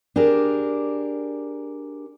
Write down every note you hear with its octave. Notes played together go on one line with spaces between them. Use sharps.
D4 G4 G#4 A#4